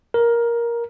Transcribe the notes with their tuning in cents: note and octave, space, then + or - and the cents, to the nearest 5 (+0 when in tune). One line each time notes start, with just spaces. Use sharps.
A#4 +10